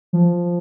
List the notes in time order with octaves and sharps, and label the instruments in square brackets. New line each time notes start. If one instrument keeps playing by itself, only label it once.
[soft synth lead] F3